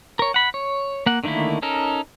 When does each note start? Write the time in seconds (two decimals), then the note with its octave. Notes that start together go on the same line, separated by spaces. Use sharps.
0.19 A#4 C#5
0.34 F#5 B5
0.54 C#5
1.06 A#3 F#5
1.24 D3 D#3 A3 A#3 E4
1.62 C#4 D#4 A4 A#4